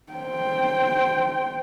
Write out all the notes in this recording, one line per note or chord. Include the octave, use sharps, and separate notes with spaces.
C5 G5